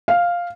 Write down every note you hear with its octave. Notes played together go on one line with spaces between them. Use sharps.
F5